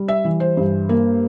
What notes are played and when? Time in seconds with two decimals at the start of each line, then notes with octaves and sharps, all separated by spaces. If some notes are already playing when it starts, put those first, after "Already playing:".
Already playing: G3
0.08 E5
0.24 E3
0.40 C5
0.57 G2
0.89 A#3